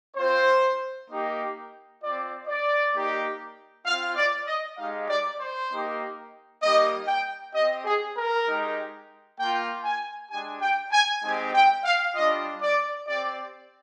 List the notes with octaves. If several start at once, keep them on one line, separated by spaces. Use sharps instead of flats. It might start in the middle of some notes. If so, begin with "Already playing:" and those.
C4 F4 C5
A#3 D#4 G4
C4 F4 D5
D5
A#3 D#4 G4
C4 F4 F5
D5
D#5
G#3 D#4 G4 F5
D5
C5
A#3 D#4 G4
G3 A#3 D#4 G4 D#5
G5
C4 G4 D#5
G#4
A#4
G#3 D#4 G4
A#3 G5
F4
G#5
G#3 D4 G4 G#5
G5
G#5
G#3 C4 D#4 G4 G#5
G5
F5
G3 D4 F4 D#5
D5
C4 G4 D5